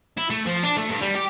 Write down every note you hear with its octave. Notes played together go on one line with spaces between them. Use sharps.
E4
A3
F3
D4
A3
G2
G3
G4